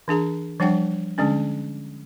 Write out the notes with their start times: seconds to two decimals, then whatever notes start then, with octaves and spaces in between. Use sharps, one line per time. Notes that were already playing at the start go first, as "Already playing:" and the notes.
0.08 E3 D4 G#4 A#5
0.60 F3 G3 D4 F#5 G5
1.18 D3 G#3 C#4 D4